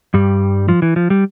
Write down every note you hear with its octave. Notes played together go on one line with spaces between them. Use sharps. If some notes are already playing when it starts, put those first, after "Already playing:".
G2 G3
F3
E3
F3
G3